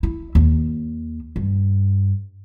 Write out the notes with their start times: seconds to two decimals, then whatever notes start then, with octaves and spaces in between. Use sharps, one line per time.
0.03 E4
0.35 D#2
1.36 G2